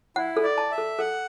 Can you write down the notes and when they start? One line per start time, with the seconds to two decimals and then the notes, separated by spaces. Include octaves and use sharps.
0.16 E4 F#5
0.37 A4
0.43 D5
0.58 A5
0.71 E5
0.78 A4
0.99 A4 F#5